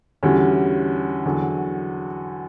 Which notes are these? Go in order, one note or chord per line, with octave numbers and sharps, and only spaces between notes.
E2 D3 G3 C#4 F#4
E2 D3 F#3